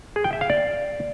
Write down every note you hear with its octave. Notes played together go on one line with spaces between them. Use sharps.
G#4
G5
E5
F5
D5